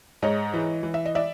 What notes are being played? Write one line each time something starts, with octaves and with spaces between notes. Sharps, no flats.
G#2 C#5 D#5
E3
E3
E5
D#5
D5 E5